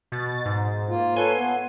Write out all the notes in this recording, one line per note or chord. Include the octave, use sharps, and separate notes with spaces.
B2 A6
G#2
A#3 F4
A4 B4 C#5 G#5 C6
B3